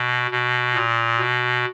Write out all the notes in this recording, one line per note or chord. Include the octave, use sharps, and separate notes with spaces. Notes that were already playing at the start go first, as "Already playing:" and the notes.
Already playing: B2
B2
A#2
B2